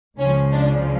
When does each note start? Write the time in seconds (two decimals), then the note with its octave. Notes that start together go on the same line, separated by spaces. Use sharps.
0.17 C#2 C#3 F3 C#4
0.52 D4